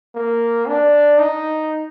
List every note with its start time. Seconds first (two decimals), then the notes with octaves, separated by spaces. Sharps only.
0.15 A#3
0.68 D4
1.19 D#4